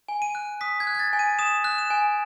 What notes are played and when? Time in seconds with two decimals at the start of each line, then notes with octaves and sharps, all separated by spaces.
0.09 G#5
0.22 D#7
0.35 F#6
0.61 D#6 B6
0.80 G#6
0.87 F#6
0.95 G#6
0.99 A6
1.13 G#5
1.19 D#7
1.39 D#6 E7
1.64 F#6
1.78 E7
1.90 G#5